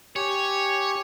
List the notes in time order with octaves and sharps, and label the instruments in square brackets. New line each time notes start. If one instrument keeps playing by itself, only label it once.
[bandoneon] G4 G#5 [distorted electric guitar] C#5